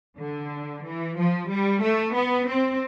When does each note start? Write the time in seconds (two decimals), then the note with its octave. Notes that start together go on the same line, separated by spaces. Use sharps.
0.19 D3
0.85 E3
1.17 F3
1.49 G3
1.82 A3
2.15 B3
2.48 C4